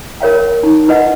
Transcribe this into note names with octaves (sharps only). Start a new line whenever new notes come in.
A#4 C#5 F5 G5
D#4
E4 B4 D#5 F#5